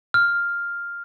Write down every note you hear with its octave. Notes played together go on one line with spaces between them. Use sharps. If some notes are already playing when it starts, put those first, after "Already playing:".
F6